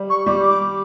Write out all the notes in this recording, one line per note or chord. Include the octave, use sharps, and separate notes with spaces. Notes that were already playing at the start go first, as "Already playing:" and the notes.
Already playing: G3
C#6
G3 D6
D6